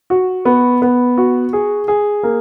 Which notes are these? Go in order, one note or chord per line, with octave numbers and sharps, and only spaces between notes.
F#4
B3
B3
F#4
G#4
G#4
A#3